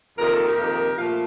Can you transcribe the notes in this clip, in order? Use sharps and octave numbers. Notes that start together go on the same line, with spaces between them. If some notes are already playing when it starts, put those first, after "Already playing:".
F2 C3 D#3 A#3 A#4
A4
G4 A#4
F2 C3 D#3 A#3
A#2 F3 A3 F5